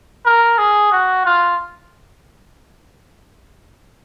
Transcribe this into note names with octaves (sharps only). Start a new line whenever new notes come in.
A#4
G#4
F#4
F4